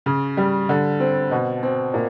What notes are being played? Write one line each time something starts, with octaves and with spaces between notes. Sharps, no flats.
C#3
G3
D3
C4
B2
C4
A#2